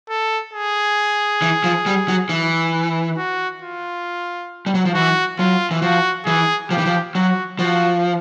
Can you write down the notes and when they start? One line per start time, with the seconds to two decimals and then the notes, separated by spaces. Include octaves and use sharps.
0.10 A4
0.54 G#4
1.42 E3
1.64 F3
1.86 G3
2.08 F#3
2.29 E3
3.18 F#4
3.62 F4
4.66 G3
4.75 F#3
4.85 F3
4.94 E3 F#4
5.39 F#3 F4
5.71 E3
5.82 F3 F#4
6.26 E3 G#4
6.70 F3 G4
6.78 E3
6.86 F3
7.15 F#3 F#4
7.59 F3 F#4